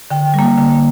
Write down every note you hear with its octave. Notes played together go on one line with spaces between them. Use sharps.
D3 G5
G3 A#3
D3